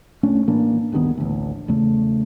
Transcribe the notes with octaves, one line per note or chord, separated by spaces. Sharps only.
C2 A3 C#4 D4
A2 E3 A#3 D4
D1 G2 D#3 B3
A1 D2
E2 C#3 A3